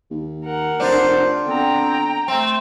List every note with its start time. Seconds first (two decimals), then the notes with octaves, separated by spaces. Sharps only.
0.11 D#2
0.45 A#4 F#5
0.80 F1 D4 F4 C5
1.47 D3 B3 C4 G5 A#5
2.28 A3 C4